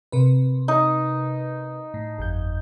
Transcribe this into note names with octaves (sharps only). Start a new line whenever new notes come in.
C3 A#4 B4
D#4
A2
G1 F2 G6